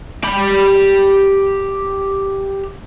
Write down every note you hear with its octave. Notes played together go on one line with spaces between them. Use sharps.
G4 B5